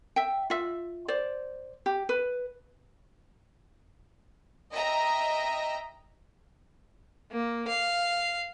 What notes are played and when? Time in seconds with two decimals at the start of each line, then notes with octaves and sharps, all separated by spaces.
0.16 E5 G5
0.50 F4 E5
1.08 C5 D5
1.86 G4
2.09 B4
4.71 D#5 E5 G5 A#5
7.32 A#3
7.68 F5